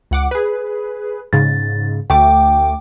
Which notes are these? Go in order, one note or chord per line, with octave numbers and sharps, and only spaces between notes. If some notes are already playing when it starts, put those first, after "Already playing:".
C#2 F#5 D6
G#4 B4
G#2 C#3 A6
D2 A3 G5 D6